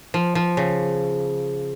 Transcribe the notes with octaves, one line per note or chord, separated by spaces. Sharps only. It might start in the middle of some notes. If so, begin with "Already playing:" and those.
F3
F3
C#3